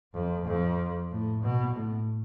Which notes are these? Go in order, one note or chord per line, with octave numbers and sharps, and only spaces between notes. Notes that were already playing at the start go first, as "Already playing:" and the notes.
F2
F2
A2
B2
A2